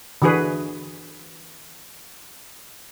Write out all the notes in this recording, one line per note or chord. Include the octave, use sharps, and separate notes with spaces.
D3 E3 F#4 G#4 B4